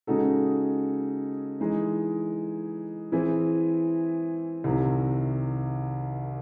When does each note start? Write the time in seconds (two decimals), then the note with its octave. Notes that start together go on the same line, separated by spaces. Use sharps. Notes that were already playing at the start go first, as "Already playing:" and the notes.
0.07 C#3 G#3 D#4 F#4 A4
1.60 E3 G#3 D#4
3.12 E3 C4 E4 G#4
4.64 C2 C3 D#3